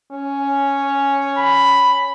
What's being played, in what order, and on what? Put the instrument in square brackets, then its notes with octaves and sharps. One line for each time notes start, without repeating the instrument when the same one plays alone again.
[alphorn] C#4
[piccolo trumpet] B5